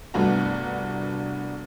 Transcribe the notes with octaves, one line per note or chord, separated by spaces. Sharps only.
C2 G2 A3 B3 F#4 A#5